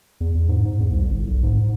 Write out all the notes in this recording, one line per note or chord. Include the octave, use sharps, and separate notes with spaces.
E2
E2
G#2
G#2
E2
C2
G1
B1
G#2
G#2